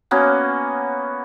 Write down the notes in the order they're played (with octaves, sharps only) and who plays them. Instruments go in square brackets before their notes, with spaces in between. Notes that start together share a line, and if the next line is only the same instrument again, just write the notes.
[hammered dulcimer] A#3 B3 C#4 F#4